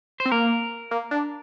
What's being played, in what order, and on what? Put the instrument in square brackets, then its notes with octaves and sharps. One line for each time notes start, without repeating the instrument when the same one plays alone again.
[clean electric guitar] C5
[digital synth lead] C4
[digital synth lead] A#3 [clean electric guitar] A#4
[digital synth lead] A#3
D4